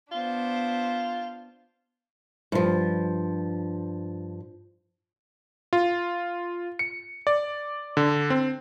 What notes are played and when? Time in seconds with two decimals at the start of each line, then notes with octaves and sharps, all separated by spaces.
0.12 B3 D4 F4 C5
2.52 G2 F3
5.73 F4
6.79 C#7
7.27 D5
7.97 D3
8.30 C4